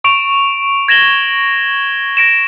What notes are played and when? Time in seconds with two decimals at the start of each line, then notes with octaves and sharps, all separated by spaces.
0.04 C#6 D7 F7
0.88 G#6 A#6 E7 F#7 G7
2.17 A#6 D7 E7